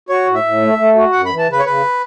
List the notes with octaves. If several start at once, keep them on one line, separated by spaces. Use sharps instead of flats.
F#4 C#5
A2
E5
A2
A3
A3
F#4
F#2 F#5
B5
E3
A5
C#3 B4
C#5
C#3 B4